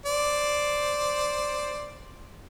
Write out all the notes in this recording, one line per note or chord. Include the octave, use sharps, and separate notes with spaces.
C5 D5